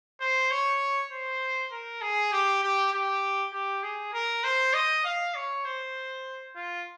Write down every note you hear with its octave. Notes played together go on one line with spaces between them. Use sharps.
C5
C#5
C5
A#4
G#4
G4
G4
G4
G4
G#4
A#4
C5
D#5
F5
C#5
C5
F4